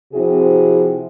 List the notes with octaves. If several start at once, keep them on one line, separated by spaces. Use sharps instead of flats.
C3 F3 C4 E4 F#4 G#4